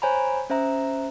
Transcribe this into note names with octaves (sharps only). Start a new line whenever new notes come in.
C5 C#5 G#5 A#5 B5
C#4 C5 E5 A#5